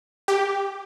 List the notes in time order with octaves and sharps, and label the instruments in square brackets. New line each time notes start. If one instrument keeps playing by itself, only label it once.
[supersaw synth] G4